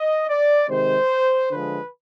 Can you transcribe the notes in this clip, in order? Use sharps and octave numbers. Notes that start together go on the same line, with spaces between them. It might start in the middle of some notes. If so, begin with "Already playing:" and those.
Already playing: D#5
D5
C3 D#3 G#3 C5
D3 F3 G#3 B4